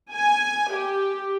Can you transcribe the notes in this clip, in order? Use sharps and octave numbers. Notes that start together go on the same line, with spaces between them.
G#5
G4